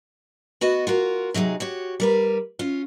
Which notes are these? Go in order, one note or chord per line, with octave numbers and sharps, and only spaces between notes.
B3 F#4 B4 D#5
F4 F#4 A#4
C3 F#3 G#3 D#4 G#4
F#4 G4 C#5
G3 A#4 B4
C#4 F4